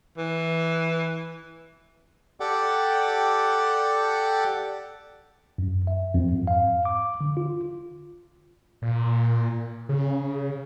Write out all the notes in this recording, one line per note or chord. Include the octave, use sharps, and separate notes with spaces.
E3
G4 A4 D5 F#5 G5
F#2
E5
F2
G#2
F5
D6
D3
F4
A#2
C#3